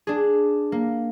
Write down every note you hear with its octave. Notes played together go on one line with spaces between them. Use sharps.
D4 G#4
A#3